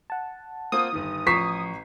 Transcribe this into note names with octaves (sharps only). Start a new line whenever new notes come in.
F#5 A5
A#3 C4 F4 D#6
G1 D#3
A1 F3 A#5 C#6 B6 C7 E7